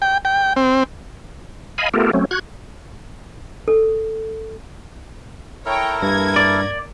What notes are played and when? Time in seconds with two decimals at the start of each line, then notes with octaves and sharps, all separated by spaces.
0.02 G5
0.25 G5
0.56 C4
1.78 D#5 F5 G#5 B5
1.94 A3 B3 F4 G4 A4 A#4
2.13 F#3 A3 C4 C#4
2.31 F#4 F#6 G#6
3.68 A4
5.66 E4 A4 A#4 C#5 G5 A#5
6.02 G2 A#3 G#6 A#6
6.36 D5